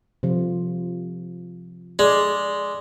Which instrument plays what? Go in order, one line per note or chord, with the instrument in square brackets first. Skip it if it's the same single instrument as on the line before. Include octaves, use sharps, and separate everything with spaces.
[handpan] C3 F3 F4
[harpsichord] G#3 [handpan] D5